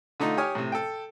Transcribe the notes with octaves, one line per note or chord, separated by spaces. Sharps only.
D3 A3 D#4 F4
G4 C#5 G#5 D#6 F6
A2 C3
A4 G5